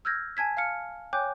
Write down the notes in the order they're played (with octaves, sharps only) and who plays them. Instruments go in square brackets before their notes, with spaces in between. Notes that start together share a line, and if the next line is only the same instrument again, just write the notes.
[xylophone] E6 F6 G6 G#6 A#6
G#5 A5 G#6 B6
F5 A5 F6 C#7
C#5 G5 G#5 D6 F#6 G6